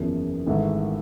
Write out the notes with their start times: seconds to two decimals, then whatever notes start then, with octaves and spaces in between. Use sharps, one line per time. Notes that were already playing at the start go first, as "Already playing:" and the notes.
Already playing: F#1 E2 C#3 F3
0.47 G#1 G#2 E3 A3